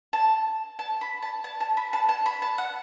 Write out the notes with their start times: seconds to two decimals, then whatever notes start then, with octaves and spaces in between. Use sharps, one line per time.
0.13 A5
0.79 A5
1.01 B5
1.22 A5
1.44 A5
1.60 A5
1.77 B5
1.93 A5
2.09 A5
2.26 B5
2.42 A5
2.58 F#5